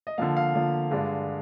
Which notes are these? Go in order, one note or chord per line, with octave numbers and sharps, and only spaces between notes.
D#5
D3 F3 A#3 F5
F5
D3 F3 A#3
G2 D3 G#3 D4